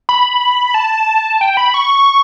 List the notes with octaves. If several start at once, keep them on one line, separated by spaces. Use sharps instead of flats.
B5
A5
G5
B5
C#6